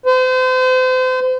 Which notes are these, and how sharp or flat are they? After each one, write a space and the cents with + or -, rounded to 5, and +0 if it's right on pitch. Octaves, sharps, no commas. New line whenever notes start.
C5 -35